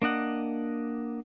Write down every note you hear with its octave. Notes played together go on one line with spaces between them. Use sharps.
A#3 D4 D#5 F#5